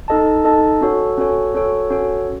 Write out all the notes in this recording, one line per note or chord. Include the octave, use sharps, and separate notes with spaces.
D#4 A4 D#5 A5
D#4 A4 D#5 A5
C#4 F#4 A4 C#5
C#4 F#4 A4 C#5
C#4 F#4 A4 C#5
C#4 F#4 A4 C#5